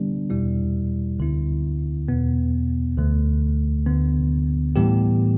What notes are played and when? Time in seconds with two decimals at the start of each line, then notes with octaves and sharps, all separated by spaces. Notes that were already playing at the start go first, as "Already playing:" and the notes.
Already playing: D3 G3 B3 D4
0.30 E2 B2 G3 E4
1.19 D2 D3 B3 E4
2.08 E2 B2 B3
2.98 D2 D3 A3
3.87 D2 D3 B3
4.76 A2 E3 G3 B3 G4